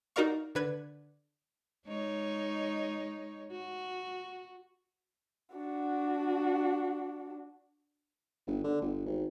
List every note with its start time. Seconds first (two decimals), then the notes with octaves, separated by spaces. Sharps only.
0.16 D#4 F#4 A#4 D5 F5 C#6
0.55 D3 B4 G#6
1.87 G#3 D#4 C#5
3.51 F#4
5.55 D4 F#4
8.47 G1
8.64 D3
8.82 G1
9.06 G#1